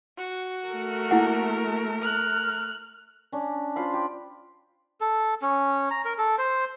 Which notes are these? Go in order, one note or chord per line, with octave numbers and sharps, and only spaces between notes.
F#4
A3 A#4
A#3 E4 A4 F#5
F6 F#6
C#4 D4
F4 C5 F5 B5
G4
A4
C#4
A#5
A#4
A4
C5